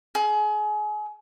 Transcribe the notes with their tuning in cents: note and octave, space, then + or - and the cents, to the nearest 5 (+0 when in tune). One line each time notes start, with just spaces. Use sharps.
G#4 +30